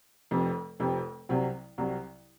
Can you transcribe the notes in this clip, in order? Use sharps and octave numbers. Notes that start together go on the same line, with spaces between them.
F1 F2 C3
F1 F2 C3
C2 C3 F#3
C2 C3 F#3